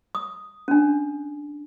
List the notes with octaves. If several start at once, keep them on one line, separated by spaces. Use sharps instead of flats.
D#6
C#4 D4